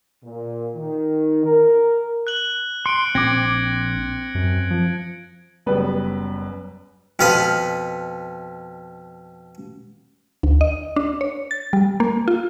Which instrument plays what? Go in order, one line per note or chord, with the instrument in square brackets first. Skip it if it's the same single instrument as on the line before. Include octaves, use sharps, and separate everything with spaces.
[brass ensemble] A#2
D#3
A#4
[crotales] F#6 F#7
[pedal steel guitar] C6 [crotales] C#7 D7
[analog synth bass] A#1 [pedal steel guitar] C4 D6 [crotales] G#6 A#6 D7
[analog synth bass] F#2
F3
[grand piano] F#1 F#2 G3 B3 B4
[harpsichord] F2 B2 F5 B5 D#6
[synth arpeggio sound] D2
D#5
D4
C#5
A6
G3
A#3
F4